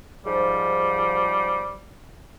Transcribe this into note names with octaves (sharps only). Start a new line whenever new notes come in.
G#2 F3 G3